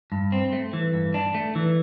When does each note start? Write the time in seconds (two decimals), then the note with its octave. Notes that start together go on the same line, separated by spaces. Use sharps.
0.12 G2
0.32 C4
0.53 A3
0.73 E3
0.94 G2
1.14 D4
1.35 A3
1.55 E3